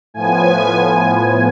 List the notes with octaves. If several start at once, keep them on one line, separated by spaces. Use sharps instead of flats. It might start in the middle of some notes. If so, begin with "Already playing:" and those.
A2 F3 B3 G#5